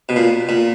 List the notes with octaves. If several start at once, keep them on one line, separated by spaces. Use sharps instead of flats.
B2
A#2
A#2